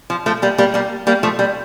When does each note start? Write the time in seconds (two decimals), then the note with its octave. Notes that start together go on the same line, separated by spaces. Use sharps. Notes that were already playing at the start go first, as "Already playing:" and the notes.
0.10 F3
0.26 F3 A3
0.42 G3 A#3
0.58 G3 A#3
0.74 G3 A#3
1.07 G3 A#3
1.23 F3 A3
1.39 G3